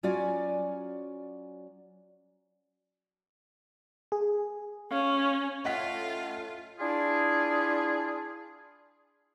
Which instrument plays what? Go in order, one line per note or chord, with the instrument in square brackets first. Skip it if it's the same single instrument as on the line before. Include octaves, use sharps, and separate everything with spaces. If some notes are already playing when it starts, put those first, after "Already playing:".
[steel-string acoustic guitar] F#3 C#4 F4 F#4 D5 G#5
[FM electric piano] G#4
[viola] C#4 [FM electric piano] F5
[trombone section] A2 A3 C#4 [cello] F4 [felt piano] D#5 F#5 B6
[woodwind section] D4 E4 F4 G#4